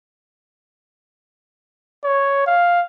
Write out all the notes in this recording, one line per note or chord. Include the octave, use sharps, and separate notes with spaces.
C#5
F5